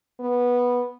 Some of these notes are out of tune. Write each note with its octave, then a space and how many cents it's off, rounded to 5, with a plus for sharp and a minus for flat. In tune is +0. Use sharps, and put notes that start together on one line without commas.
B3 -10